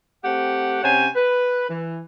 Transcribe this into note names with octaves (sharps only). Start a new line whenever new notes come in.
A3 C4 G4 F#5
C3 C#4 C5 C#5 F#5 G#5
B4
E3